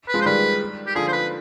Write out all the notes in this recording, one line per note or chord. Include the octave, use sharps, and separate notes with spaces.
B4
F3 G#3
C5
D#3 G3 B4
G4
D3 F3 G#4
C5
B4